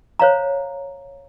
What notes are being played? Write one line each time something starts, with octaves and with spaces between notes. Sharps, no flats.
C5 C#5 F5 A#5